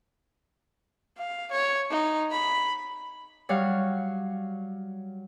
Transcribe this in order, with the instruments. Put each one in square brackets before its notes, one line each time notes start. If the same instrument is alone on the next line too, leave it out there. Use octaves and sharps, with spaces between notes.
[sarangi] F5
C#5
D#4
B5
[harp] F#3 G3 C#5 F5 F#5